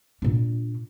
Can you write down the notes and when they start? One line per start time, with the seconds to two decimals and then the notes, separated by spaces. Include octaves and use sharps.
0.22 A#2 D4